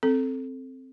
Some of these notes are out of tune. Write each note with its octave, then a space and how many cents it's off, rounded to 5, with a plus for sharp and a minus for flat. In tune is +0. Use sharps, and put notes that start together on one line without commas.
C4 +0 A4 +0